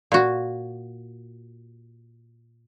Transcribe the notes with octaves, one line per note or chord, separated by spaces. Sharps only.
A#2 F#4